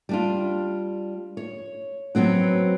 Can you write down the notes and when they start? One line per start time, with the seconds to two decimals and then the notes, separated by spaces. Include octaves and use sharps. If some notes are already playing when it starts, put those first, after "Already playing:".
0.09 G3 D4 F4
1.37 C#5
2.15 F#3 B3 C4 F#4